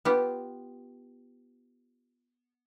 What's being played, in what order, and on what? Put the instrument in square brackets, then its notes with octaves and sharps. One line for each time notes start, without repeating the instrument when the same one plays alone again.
[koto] B3 F4 G4